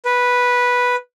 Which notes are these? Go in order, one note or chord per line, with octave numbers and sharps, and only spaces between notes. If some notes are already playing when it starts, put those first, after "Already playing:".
B4